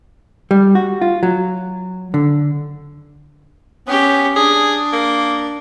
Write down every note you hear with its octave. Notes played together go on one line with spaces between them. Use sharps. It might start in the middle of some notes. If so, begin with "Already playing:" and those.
G3
F#4
F4
F#3
D3
B3 C#4 G4
D4 G#4
A#3